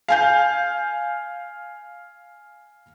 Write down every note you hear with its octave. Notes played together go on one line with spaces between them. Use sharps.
F5 G#5 G6